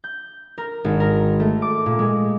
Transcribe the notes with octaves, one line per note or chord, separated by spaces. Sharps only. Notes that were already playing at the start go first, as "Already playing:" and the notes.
G6
A#4
G#1
A#4
A3
D6
A#2
G#3